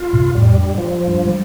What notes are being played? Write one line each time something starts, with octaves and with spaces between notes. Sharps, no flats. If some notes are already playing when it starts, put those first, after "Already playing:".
Already playing: F4
G2 C3
F2 A2 G3
G2
F3
G2
G3